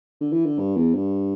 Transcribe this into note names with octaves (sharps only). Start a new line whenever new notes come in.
D3
E3
D3
G2
E2
G2